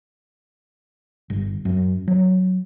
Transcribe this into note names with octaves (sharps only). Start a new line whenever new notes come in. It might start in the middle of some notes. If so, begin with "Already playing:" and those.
G1
F#2
F#3